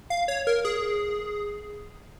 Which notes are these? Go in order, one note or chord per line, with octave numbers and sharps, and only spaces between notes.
F5
C#5
A#4
G#4